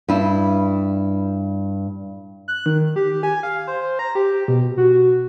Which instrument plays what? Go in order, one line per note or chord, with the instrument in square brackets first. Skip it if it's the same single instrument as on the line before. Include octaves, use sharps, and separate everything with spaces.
[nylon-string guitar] G2 E4
[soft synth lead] F#6
D#3
G4
G#5
F5
C5
A#5
G4
B2
F#4